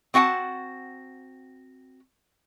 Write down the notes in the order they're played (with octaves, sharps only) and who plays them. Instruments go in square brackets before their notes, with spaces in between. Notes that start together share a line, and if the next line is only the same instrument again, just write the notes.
[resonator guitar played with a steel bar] C4 F#4 F#5 G5 A5